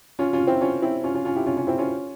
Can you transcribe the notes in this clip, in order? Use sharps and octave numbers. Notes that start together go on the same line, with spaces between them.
C#4 F4
C#4 F4
C4 E4
C#4 F4
C4 E4
C#4 F4
C#4 F4
C#4 F4
E4 G4
C#4 F4
C#4 F4
C4 E4
C#4 F4